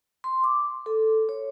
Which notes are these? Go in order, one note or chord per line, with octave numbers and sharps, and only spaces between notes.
C6
D6
A4
C#5